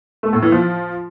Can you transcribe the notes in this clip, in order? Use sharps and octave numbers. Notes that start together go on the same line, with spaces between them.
A3
A2
E3
F3